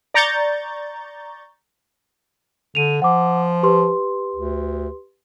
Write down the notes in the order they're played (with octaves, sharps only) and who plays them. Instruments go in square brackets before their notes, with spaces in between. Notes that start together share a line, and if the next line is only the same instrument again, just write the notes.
[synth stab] D5 A#5 C#6 G6 A6
[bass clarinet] D3 [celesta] D#7 F7
[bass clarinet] F3 [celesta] F#5 D6
[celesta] G4 B4 C6
[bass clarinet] D2